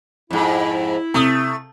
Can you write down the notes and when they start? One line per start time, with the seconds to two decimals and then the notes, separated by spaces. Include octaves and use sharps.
0.31 F2 G#2 E4
1.14 C3 A3 D#6